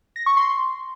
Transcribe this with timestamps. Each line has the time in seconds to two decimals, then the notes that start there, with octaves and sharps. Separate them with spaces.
0.16 A#6
0.26 C#6
0.37 C6